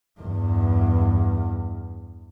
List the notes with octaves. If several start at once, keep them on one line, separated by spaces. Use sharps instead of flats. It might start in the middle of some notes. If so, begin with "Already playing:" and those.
E2 G2